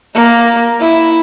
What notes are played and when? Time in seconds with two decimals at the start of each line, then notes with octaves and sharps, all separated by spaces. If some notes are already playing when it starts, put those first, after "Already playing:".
0.14 A#3
0.80 E4